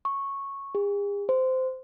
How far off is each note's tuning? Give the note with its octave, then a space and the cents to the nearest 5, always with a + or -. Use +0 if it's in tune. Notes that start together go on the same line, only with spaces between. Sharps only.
C#6 -10
G#4 -45
C5 -15